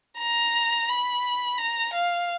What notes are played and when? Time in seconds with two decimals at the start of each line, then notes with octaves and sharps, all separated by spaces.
0.19 A#5
0.89 B5
1.58 A#5
1.93 F5